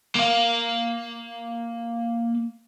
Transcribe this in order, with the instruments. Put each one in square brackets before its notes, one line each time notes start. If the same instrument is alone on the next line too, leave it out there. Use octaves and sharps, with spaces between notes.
[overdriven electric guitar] A#3 F5